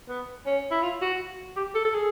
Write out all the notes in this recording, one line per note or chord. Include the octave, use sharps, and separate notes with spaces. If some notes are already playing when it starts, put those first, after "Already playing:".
B3
C#4
E4
F4
F#4
G4
A4
A4
G#4